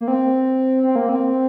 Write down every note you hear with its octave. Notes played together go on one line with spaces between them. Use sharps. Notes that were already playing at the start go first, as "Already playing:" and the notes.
A#3
C4
C4
A#3
C4